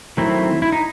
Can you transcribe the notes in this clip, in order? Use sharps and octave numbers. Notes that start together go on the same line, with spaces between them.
D#3 F#3 A3 C4 E4
E4
D#4